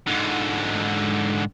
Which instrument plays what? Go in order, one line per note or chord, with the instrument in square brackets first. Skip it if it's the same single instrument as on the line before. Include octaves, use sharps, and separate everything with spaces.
[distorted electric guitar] G#2 D3